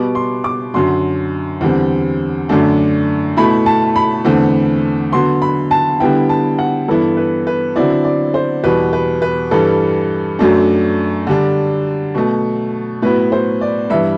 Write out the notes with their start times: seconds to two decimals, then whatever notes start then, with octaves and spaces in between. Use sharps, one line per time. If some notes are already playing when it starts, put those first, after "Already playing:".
Already playing: B2 G3 B3 D6
0.15 C6
0.44 D6
0.74 F#2 D3 F#3 C6
1.61 E2 D3 G3 C4
2.49 F#2 D3 A3 D4
3.37 B2 A3 E4 B5
3.66 A5
3.96 B5
4.25 E2 D3 A3 C4
5.13 D3 F#3 B3 C6
5.42 B5
5.71 A5
6.00 D3 G3 B3 E4 G5
6.29 A5
6.59 F#5
6.88 G2 E3 B3 E4 A4
7.17 B4
7.47 B4
7.76 D3 F#3 C4 E4 D5
8.05 D5
8.34 C5
8.64 E2 B2 G3 B4
8.93 B4
9.22 B4
9.51 G2 E3 G3 A4
10.39 F#2 F#3 A3 D4
11.27 D3 G3 D4
12.15 B2 F#3 A3
13.02 A2 F#3 B3 E4 B4
13.32 C5
13.61 D5
13.90 G2 E3 G3 E5